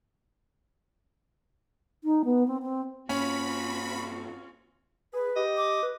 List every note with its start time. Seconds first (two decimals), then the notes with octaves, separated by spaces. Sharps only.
2.04 D#4
2.25 B3
2.48 C4
2.63 C4
3.09 G2 A#3 C4 C#4 F4 F#4 B5
5.13 G#4 B4
5.36 G4 D#5
5.57 D6
5.83 B4